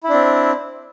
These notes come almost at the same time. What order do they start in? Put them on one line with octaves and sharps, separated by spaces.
E4 D4 C4